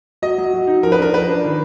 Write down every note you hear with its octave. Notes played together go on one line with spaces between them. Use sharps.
F#3 D#5
F#3
F#3
D#4
F3 A#4
B4
D4 A#4
F3 B4
D4
D#3